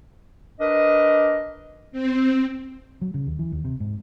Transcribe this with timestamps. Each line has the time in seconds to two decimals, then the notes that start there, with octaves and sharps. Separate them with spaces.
0.60 D4 A#4 B4 D#5
1.92 C4
3.01 F#3
3.14 C#3
3.27 D#2
3.39 E3
3.52 D#2
3.65 C3
3.80 G#2